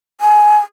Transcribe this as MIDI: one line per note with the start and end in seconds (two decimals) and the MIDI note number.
0.21 0.58 80